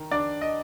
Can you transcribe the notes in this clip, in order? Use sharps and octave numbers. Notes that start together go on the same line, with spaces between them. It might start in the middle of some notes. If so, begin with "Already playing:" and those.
Already playing: D#3
D4 D5
D#5